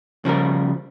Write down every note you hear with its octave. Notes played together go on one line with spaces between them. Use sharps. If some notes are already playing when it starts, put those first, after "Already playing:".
C#3 F3 G3 A#4